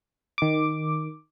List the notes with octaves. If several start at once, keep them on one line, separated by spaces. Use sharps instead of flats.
D#3 D6